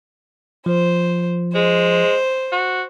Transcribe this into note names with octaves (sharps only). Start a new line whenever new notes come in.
F3 C5
G#3 C5
F#4